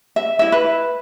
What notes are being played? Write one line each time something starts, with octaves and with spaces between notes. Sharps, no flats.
E5
E4 E5
B4